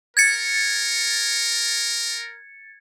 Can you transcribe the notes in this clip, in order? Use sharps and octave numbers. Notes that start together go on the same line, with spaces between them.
A#4 G#6 A6 C#7